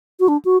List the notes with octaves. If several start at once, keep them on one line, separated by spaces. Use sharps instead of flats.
F#4
D4
F#4